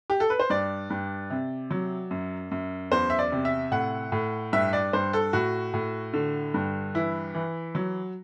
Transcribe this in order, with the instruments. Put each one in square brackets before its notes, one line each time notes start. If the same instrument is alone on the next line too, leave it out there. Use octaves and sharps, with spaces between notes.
[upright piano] G4
A4
B4
C5
G2 D5
G2
C3
F#3
F#2
F#2
E2 C5
E5
D5
C3
E5
A2 F#5
A2
G2 E5
D5
G2 C5
A4
A2 F#4
A2
D3
G2
E3 E4
E3
F#3